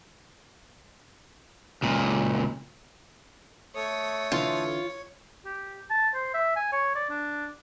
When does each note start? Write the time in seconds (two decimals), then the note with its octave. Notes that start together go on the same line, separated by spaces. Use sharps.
1.82 C#2 A#2
3.75 A3 A4 C#5 D#6
4.32 D3 E3 F4
5.45 G4
5.91 A5
6.15 C5
6.34 E5
6.56 G#5
6.72 C#5
6.95 D5
7.10 D4